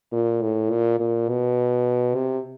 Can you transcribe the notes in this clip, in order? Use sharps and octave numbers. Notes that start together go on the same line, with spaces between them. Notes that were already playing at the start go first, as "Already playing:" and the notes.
A#2
A2
A#2
A#2
B2
C3